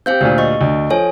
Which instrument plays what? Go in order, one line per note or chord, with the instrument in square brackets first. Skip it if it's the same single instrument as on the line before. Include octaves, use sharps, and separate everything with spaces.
[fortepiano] C4 G4 [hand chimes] C5 F5 G6
[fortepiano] D2 A#2 [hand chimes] G4
[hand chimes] D#5 C#6
[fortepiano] D2
[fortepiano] F3 [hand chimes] A4 C#5 G#5